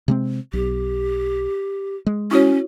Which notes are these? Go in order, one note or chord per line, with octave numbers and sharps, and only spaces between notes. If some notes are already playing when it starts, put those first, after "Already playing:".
C3 G#3 C4
B1 G4
G#3
C#4 E4 F#4 C#5